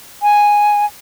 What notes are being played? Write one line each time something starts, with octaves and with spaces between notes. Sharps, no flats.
G#5